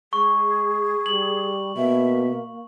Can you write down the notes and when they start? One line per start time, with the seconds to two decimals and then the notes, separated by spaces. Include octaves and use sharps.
0.13 G#3 G#4 C#6
1.06 G3 F#7
1.77 B2 A#3 E5